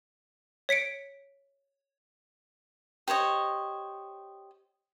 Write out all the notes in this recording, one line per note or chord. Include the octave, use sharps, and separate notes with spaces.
C#5 B6 C#7 D7
G4 C5 C#5 D#5